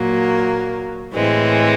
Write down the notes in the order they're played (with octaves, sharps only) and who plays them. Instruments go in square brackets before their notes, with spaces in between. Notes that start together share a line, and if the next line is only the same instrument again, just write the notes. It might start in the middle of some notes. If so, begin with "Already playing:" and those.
Already playing: [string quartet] A#2 F#3 A#3
A2 E3 G#3 C4